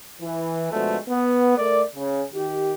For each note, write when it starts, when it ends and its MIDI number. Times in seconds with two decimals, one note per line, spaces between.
0.21 0.71 52
0.71 0.97 47
0.71 0.97 50
0.71 0.97 53
0.71 0.97 56
0.71 0.97 57
1.08 1.54 59
1.57 1.82 57
1.57 1.82 70
1.57 1.82 74
1.95 2.23 49
2.33 2.74 51
2.33 2.74 67